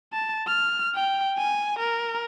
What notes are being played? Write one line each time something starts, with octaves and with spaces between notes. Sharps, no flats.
A5
F6
G5
G#5
A#4